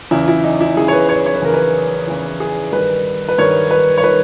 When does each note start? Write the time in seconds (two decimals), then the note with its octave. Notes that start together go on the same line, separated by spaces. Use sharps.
0.11 E2 C#3 E3 E4
0.28 E4
0.44 D#4
0.61 E4
0.77 E2 C#3 E3 G#4
0.88 C#5
0.93 B4
1.09 C#5
1.26 C#5
1.36 B4
1.42 E2 C#3 E3 A#4
1.54 B4
2.07 E2 C#3 E3
2.40 G#4
2.72 G2 D#3 B4
3.29 B4
3.38 G2 D#3 C#5
3.71 B4
3.98 C#5
4.04 D#3 B4